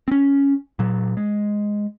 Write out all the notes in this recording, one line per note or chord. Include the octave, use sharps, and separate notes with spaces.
C4 C#4
A#2 F#3
G#3